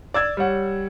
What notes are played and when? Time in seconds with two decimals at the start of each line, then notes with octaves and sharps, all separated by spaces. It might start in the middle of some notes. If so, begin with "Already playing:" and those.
0.14 D5 E6 G#6
0.37 G3 C#5 F#5